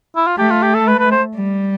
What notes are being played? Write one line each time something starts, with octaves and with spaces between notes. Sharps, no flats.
E4
F4
A3 G4
F4
G4
A4
B4
B4
C5
G3